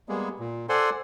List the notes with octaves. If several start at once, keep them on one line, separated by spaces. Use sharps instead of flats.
G3 G#3 A#3 B3 G#4
A#2
A4 C5 D5 F#5 G#5 C6